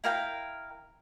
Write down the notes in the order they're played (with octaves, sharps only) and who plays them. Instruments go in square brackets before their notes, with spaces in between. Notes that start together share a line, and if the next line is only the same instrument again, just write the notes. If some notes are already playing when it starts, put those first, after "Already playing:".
[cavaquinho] E4 A#4 F5 G5